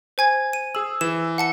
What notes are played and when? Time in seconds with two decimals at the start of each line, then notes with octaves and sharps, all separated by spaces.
0.18 C5 G#5 G#6
0.53 D#7
0.75 G#4 E6 F#7
1.01 E3 E7
1.38 F#5 A5 C#7